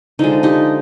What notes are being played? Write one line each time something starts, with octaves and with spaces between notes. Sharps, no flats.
D3 F3 G#3 D#4
D#4 G4